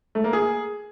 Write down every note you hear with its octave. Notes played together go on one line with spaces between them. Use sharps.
A3
A#3
G#4